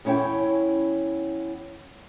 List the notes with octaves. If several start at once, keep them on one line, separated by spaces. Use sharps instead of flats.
E2 C#4 E4 C#5 G5